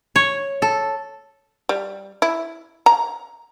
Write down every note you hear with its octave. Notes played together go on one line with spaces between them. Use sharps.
C#5
A4
G3
E4
A#5